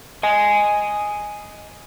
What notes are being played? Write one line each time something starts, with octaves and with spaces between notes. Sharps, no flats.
D#5 G#5